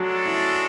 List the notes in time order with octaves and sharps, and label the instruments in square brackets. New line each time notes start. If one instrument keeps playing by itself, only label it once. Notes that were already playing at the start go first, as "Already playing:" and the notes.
Already playing: [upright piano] F#3 [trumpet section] G#3 D4 F#4 A4
[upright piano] E4